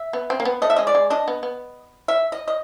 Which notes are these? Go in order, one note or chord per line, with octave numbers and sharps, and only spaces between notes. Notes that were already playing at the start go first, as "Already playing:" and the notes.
Already playing: E5
B3
C4
A#3
B3
A3 D#5
E5
G#3 D#5
D5
G#3
D4 D#5
B3
B3
E5
D#5
D#5